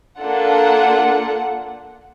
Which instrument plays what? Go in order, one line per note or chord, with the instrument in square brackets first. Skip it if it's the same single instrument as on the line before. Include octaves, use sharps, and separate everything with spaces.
[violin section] A#3 D4 F4 A4 F#5